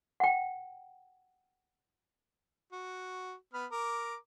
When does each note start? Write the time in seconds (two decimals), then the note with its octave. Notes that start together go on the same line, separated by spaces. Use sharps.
0.20 F#5 G5
2.73 F#4
3.54 B3 B5 F6
3.72 A#4 A#5 D6